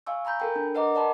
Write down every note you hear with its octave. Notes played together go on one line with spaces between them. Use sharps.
F5 G#5 C#6 E6
G#5 A#5 B5 G6
A4 A#4 G5
D4
A#4 B4 D#5 F#5 A#5 D6
D5 F#5 A5 B5